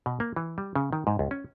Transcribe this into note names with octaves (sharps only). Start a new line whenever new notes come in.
B2
A#3
E3
G3
C#3
D#3
G#2
C#2
C#4